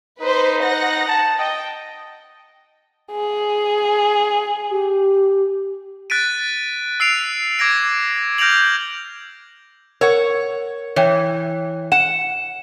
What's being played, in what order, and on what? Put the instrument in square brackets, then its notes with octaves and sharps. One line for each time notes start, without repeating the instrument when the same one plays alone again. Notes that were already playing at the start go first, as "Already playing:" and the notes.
[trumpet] D#4 [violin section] B4 C5
[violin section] F#5 A#6
[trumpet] A5
[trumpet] D#5 [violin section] G5
[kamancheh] G#4
[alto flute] G4
[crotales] F#6 A6 B6 D7 D#7
E6 C7 D7 F7
D6 G#6 A#6 D7
F6 G6 A#6 D7 F7 F#7
[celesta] A#4 [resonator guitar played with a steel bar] C#5 F#5
[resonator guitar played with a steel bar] E3 [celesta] C#5 G5
[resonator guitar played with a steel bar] F#5 [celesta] E7